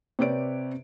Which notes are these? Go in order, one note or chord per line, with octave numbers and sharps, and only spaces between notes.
C3 G4 B4 C#5 D5 D7